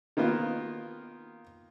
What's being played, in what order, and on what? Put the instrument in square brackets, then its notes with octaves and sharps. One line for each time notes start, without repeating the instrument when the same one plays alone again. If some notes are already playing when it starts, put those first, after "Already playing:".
[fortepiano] D#3 A#3 B3 F4